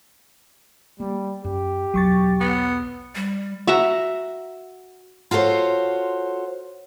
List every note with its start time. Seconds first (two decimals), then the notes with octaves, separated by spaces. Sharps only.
1.00 G3 A#3
1.44 F#2 G4
1.94 B1 E2 F#3 C#6 A6
2.41 B3
3.15 G3
3.67 F#4 E5 F#5 A#5
5.31 F4 F#4 A4 C5 C#5